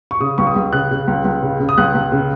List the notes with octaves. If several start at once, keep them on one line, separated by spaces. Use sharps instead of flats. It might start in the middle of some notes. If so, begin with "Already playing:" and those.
C#6
C#3 D#6
C#2 C#6
D#6
C#2
C#3 F#6
C#3
C#2
C#2
C#3
C#3
D#6
C#2 F#6
C#2
C#3